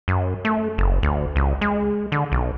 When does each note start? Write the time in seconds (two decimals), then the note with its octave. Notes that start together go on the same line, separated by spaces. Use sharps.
0.08 F#2
0.45 A3
0.78 F#1
1.03 D2
1.36 C#2
1.61 G#3
2.12 D3
2.32 B1